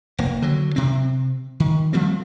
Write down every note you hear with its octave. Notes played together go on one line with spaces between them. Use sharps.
F1 A#3
D3 F#3
C3 C4
D#3
F3 G3 A3 C4